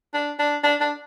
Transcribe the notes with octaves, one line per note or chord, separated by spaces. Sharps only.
D4
D4
D4
D4